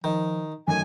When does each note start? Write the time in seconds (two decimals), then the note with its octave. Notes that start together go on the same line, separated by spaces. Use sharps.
0.04 D#3 F3
0.68 F#2 D#3 A3 A#4 G#5